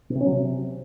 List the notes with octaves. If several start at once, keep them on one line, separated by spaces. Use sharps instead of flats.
B2
C3
C#4
F#3
C3